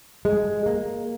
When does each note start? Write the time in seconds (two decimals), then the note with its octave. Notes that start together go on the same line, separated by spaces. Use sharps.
0.25 G#3
0.66 A#3